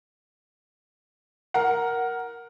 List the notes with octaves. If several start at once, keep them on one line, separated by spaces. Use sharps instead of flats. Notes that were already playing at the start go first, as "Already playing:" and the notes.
A#4 F#5